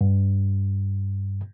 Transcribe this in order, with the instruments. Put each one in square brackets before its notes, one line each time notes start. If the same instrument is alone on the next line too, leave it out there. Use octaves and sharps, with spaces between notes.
[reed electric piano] G2